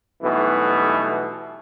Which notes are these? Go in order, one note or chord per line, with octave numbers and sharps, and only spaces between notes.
B1 G2 B2 E3 A3 B3